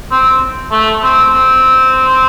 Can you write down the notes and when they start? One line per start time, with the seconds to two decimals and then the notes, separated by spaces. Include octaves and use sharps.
0.11 C4
0.71 A3
1.02 C4
1.33 C4